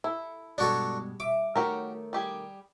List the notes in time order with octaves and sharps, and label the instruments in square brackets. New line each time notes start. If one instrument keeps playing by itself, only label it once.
[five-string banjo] E4 [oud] A4
[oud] G2 B2 G#3 [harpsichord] D4 F#4 A4
[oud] E5 [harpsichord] D6
[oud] D#3 A3 C#5 [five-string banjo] F#4 G4 A#4
[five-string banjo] G3 G4 G#4